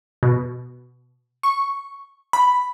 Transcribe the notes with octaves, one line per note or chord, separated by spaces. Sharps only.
B2
C#6
B5